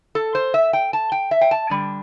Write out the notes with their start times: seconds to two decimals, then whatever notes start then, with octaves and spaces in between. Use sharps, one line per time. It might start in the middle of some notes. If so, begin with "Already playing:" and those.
0.15 A4
0.35 C5
0.54 E5
0.73 G5
0.93 A5
1.12 G5
1.31 E5
1.41 G5
1.51 A5
1.70 D3 G3 D4